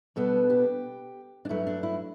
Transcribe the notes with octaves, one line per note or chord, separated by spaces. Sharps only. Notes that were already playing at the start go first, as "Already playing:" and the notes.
B2 G3 B3 D4 A4
G4
D4
G2 F#3 A3 E4
D4
E4